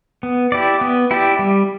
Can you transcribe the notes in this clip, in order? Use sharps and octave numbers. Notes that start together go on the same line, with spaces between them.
B3
E4 G4 D5
B3
E4 G4 D5
G3